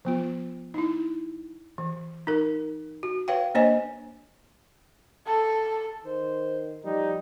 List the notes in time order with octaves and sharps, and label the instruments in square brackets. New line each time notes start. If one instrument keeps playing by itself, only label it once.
[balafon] F3 B3 F4
D#4 E4
E3
D#4 A#4
F#4
B4 C#5 F5 G5
A#3 D4 C5 C#5 D#5 G#5
[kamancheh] A4
[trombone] D#3 [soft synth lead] C5
[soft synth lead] F3 [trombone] G3 [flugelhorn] D#4